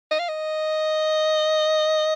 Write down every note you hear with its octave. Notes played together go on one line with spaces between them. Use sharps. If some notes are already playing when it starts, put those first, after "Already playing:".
D#5
F5
D#5